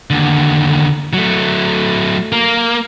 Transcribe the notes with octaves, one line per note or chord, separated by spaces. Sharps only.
D#2 D3
F#3 A3
A#3